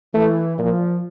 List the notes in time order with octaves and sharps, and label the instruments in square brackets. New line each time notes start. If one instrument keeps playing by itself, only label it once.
[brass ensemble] E3 [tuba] A3
[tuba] A#2 [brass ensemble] F3